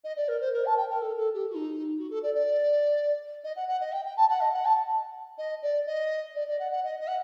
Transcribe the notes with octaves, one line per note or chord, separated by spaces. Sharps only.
D#5
D5
A#4
C5
A#4
A5
G5
A#4
A4
A4
G4
F#4
D#4
F#4
A4
D5
D5
D#5
F#5
F#5
D#5
G5
G5
A5
F#5
D#5
F#5
A5
D#5
D5
D#5
D5
D5
F#5
F#5
D#5
D#5
F#5